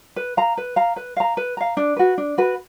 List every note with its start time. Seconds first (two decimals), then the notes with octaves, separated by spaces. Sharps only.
0.16 B4
0.37 F5 A#5
0.57 B4
0.76 F5 A#5
0.96 B4
1.17 F5 A#5
1.37 B4
1.57 F5 A#5
1.77 D4
1.96 F#4 B4
2.18 D4
2.38 F#4 B4